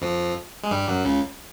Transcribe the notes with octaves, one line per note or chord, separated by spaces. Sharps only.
F2 F3
G#3
G2 G3
F#2 F#3
C#2 C#3